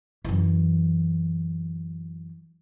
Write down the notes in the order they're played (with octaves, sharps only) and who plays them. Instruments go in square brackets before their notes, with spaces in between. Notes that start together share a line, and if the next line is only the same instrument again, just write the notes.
[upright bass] F#2 E3